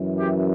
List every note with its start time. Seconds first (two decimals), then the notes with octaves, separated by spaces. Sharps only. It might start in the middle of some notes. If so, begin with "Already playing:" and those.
Already playing: F#2 E3
0.17 G4